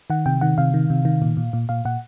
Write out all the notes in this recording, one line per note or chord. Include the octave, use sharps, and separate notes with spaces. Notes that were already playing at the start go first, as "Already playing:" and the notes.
D#3 F#5
C3 G5
D#3 F#5
C3 F5
D#3
C3
D#3
A#2
A#2
A#2
A#2 F5
A#2 F#5